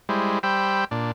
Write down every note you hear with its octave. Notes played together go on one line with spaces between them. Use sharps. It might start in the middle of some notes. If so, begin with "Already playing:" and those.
G3 G#3 E4 C5
G3 C5 G5 B5 E6
A#2 D4